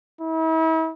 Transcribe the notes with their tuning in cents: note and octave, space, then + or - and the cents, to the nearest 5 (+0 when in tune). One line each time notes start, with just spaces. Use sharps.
E4 -40